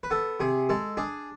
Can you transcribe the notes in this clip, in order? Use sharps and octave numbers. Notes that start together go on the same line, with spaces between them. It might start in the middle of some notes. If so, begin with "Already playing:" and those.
B4
B3 A4
C3 G#4
G#3 A4
D4 G#4